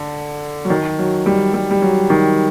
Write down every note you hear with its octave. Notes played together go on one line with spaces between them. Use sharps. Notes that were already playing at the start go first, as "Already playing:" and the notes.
Already playing: D3
F#3
D#3
F#3
G3
G3
G3
F#3
D#3